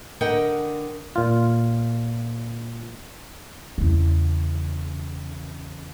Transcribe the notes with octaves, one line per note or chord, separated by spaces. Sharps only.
D3 A#4 D#5 F#5 G5
A#2 F4
E2 C#3